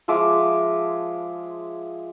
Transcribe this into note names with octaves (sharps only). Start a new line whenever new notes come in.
F3 G#3 E5 D6